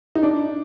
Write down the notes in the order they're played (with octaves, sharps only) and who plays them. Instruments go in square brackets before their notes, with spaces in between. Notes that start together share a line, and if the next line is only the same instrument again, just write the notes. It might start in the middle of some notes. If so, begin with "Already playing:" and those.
[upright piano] D#4
D4